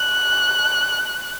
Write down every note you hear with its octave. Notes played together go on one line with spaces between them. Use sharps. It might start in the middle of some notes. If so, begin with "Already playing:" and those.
Already playing: F#6